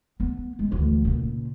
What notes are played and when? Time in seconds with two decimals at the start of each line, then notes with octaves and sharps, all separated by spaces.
0.20 B3
0.59 G#3
0.71 D2 E3
1.05 A#2 C#3